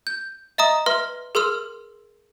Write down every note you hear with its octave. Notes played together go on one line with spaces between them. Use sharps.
G6
D#5 E5 A#5 D#6
B4 E5 C6 F6
G#4 A#4 C6 E6 F6